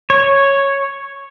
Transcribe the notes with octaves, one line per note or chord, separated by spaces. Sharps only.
C#5